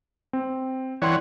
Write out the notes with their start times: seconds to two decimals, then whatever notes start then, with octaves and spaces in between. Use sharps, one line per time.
0.33 C4
1.02 E3 C#5 D5 F#5 G5 C6